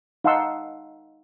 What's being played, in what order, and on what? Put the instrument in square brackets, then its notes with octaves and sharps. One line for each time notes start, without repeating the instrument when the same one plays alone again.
[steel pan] D#4 F5 F#5 A5 C6 E6